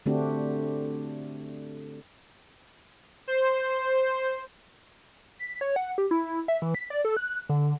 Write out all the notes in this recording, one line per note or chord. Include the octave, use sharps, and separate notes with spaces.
D3 A3 C4 D4 F#4 G4
C5
B6
C#5
F#5
G4
E4
E5
E3
B6
D5
A4
F#6
D3